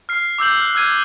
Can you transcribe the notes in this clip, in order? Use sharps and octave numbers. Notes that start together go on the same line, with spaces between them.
F6 C7
D6 E6 G6 F#7
F#6
E6 F6 G#6 D#7